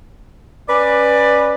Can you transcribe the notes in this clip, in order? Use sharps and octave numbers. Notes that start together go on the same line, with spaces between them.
C#4 B4 D5